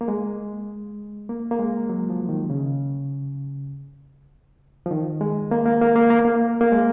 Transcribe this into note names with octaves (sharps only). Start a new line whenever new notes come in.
A#3
G#3
A#3
A#3
G#3
F#3
F3
D#3
C#3
F3
D#3
G#3
A#3
A#3
A#3
A#3
A#3
A#3
A#3
G#3